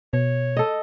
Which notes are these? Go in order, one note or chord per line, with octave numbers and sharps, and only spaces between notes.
B2 C#5
A4 D#5